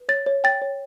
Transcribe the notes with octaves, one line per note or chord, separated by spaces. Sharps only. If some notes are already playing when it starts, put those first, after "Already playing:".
Already playing: B4
C#5 A6
C#5
G5 A6
C#5